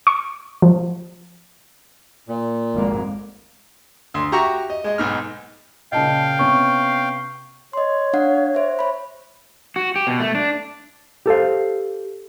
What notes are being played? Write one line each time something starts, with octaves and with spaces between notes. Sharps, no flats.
C#6
F3
A#2
G#1 F2 A#3
D2 C6
F#4 G4 E5 A#5 C#6
D#5
G#3 D#5
B1 G#2 F6
A#2 C#3 D#5 F5 G5 A5
C3 B3 C#4 C#6
C#5 D#5 C6
D4 F5 F#5
C5 E5
C#5 B5
F#4
G4
B2
A3
D4
G4 A4 C5 F5